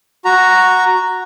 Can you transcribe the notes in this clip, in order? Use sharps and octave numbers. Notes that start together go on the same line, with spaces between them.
F#4 A#5